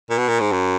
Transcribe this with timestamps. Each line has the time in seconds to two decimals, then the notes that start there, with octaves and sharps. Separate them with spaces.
0.10 A#2
0.18 B2
0.28 A#2
0.40 G#2
0.52 F#2